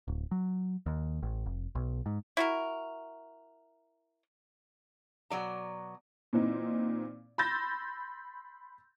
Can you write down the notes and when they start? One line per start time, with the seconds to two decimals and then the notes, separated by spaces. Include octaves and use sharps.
0.08 D1
0.31 F#3
0.86 D#2
1.22 A1
1.46 F1
1.75 B1
2.06 G#2
2.37 E4 F#4 A#4
5.30 B2 F#3 D5 A#5
6.33 A#2 E3 C4 D#4
7.38 B5 C6 E6 G6 A6 A#6